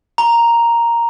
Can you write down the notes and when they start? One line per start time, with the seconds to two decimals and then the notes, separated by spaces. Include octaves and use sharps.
0.18 A#5